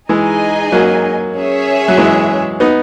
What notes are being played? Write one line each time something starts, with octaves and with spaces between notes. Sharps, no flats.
E3 G#3 D#4 G#4 D#5 G#5
F#3 A#3
C#4 G#4 C#5 E5
F#3
E3 G#3
B3 D#4